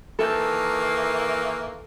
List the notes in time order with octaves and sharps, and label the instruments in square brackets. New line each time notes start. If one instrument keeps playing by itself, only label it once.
[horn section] D#3 E3 A#3 [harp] A4 G6